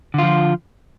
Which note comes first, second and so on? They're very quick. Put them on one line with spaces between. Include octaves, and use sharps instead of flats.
D3 F4 F3